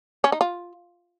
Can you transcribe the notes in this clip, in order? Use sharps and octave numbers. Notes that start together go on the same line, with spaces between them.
C#4
D#4
F4